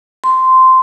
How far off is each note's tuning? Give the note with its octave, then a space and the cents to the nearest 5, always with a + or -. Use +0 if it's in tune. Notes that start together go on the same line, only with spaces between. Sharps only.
C6 -10